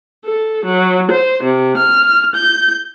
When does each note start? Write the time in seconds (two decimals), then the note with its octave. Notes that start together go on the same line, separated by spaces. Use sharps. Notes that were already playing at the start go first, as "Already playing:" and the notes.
0.24 A4
0.65 F#3
1.11 C5
1.44 C3
1.77 F6
2.36 G6